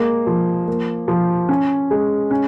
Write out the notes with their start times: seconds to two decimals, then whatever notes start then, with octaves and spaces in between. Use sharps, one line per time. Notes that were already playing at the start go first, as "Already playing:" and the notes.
Already playing: G#3 A#3
0.27 F3
0.68 A#3
1.08 F3
1.49 C#4
1.91 G#3
2.31 C#4